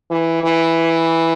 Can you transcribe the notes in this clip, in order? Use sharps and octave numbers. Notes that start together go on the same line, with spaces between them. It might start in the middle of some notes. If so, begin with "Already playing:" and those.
E3
E3